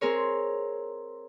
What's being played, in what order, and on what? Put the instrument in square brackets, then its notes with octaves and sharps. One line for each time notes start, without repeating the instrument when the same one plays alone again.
[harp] C4 G#4 A#4 C#5